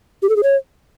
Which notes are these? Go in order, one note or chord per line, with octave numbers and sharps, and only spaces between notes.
G4
A4
G#4
C#5